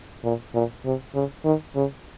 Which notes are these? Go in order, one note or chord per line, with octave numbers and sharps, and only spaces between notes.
A#2
A#2
C3
C#3
D#3
C#3